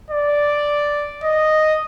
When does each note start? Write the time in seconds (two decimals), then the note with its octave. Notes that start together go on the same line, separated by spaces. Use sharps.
0.10 D5
1.23 D#5